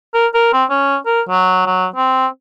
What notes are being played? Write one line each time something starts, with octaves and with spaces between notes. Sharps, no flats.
A#4
A#4
C4
C#4
A#4
F#3
F#3
C4